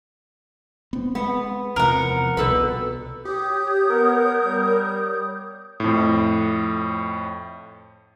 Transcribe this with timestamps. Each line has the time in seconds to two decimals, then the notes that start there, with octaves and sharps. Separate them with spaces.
0.93 B3 C4
1.15 G#3 B3
1.76 E2 C3 F3 A#4 F#5
2.37 C2 B2 G3 A4 B4
3.25 G4 C#5 D#6 G6
3.90 B3 A#4
4.42 G3
5.80 F2 A2